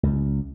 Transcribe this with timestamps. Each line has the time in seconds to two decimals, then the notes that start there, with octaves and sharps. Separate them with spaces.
0.03 C#2